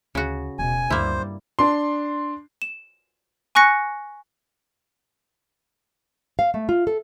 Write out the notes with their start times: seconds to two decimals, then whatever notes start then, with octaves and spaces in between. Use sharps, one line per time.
0.15 D2 C#3 F#4
0.59 D#1 B2 G#5
0.90 D2 G2 G3 A#3 E4 C5
1.59 D4 C6
2.62 E7
3.55 G#5 C#6 F#6 A#6 C#7
6.39 F5
6.54 A3
6.69 F4
6.87 A4